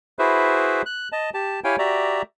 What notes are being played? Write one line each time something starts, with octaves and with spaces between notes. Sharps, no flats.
E4 F#4 G#4 B4 C5 E5
F#6
D#5 A5
G4 A5
E4 G4 C#5 F5 G5 G#5
F#4 G4 D5 E5 A#5